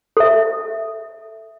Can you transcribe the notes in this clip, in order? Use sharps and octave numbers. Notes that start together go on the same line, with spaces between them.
A4 E5